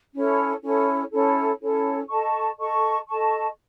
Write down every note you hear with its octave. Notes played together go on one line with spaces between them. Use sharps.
C#4 E4 A4 C#5
C#4 E4 A4 C#5
C#4 E4 A4 C#5
C#4 E4 A4 C#5
A4 D#5 A5 C#6
A4 D#5 A5 C#6
A4 D#5 A5 C#6